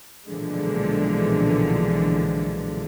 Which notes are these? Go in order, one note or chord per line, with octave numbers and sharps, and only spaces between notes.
B1 A#2 D3 E3 F3 G#3